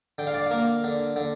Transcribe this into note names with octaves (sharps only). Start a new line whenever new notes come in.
D3 G5
F5
D5
F5
A#3
D3
D3